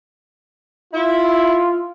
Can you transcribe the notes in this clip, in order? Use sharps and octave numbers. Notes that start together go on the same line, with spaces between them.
E4 F4